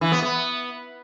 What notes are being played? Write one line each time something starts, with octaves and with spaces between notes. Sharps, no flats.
E3
B3
B3